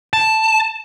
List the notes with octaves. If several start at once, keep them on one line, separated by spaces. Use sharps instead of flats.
A5